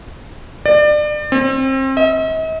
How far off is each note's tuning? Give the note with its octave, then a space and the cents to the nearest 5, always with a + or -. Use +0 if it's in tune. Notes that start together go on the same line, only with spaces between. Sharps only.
D5 +30
C4 +30
D#5 +45